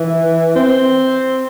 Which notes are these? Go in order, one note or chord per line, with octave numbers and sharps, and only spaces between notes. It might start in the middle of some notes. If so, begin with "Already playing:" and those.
Already playing: E3
C4